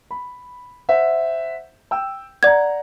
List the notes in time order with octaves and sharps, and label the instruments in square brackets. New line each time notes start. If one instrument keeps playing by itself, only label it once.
[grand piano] B5
C5 E5 F#5
G5 E6
[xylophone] D5 G#6 [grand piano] F#5 A#5